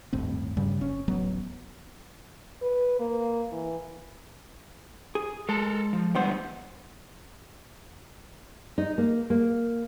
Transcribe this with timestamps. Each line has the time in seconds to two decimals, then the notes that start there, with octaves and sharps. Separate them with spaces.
0.13 G1 D#2 A2 C4
0.57 G2 C#3 G3
0.81 F#1 C#4
1.08 D1 A1 F#3 B3
2.62 B4
3.00 A#3
3.52 E3
5.15 G#4
5.49 G#3 A4 A#4 A5
5.93 F3
6.15 D3 E3 G3 B3 C5
8.78 D#4
8.98 A#3
9.30 A#3